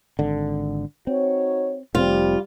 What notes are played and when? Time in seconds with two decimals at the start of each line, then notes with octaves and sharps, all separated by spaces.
0.19 G#1 D3
1.07 C4 D#4 F#4 C#5
1.95 F1 G3 C4 F4